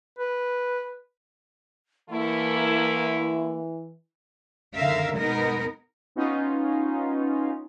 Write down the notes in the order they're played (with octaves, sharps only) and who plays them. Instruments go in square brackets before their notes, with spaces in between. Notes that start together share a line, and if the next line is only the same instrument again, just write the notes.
[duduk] B4
[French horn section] D3 A3 E4 [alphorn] E3 [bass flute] A#3
[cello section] D3 D#3 A#4 E5 F5
B2 G#3 B3 D#4 A#4
[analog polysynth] B3 C#4 D#4 F4